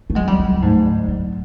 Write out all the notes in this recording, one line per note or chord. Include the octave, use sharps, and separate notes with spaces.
A3
F#3 G#3
G3
D2 G3
C#3
G#2 A3
D3
A2 F#3